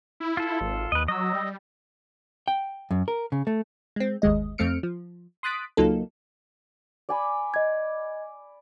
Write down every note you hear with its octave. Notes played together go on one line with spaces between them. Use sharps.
E4
F4 A4
G#1
D#2 B4 D#5
F#3 D#5 E6
G3
G5
F#2
A#4
C#3
A3
G#3 C4
G1 D#2 G#3 D#5
F2 A3 C4 F6 C#7 D7
F3
C6 D#6 F#6 A6 B6 D7
C#2 F#3 A#3 D#4 F4 A4
D5 G#5 B5
D#5 G#6